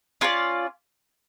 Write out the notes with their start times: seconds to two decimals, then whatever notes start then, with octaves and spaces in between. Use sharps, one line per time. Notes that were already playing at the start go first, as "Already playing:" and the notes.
0.21 C#4 F4 A#4 D5